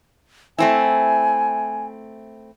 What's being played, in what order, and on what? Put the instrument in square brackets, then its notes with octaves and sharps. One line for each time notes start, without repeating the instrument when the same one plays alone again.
[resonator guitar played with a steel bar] A3 C4 E4 [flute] G#5